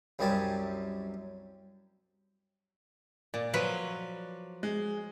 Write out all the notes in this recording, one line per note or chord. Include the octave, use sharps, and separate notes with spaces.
C2 F#2 G3 G#5 A5
A#2 D5
F3 F#3 B4
G#3